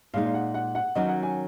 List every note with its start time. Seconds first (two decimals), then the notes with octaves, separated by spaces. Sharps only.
0.14 A#2 G#3 D#4 F5
0.26 F5
0.34 F#5
0.54 F#5
0.75 F#5
0.95 D#3 F#3 C#4 F#4 D#5
1.08 F#5
1.23 G#5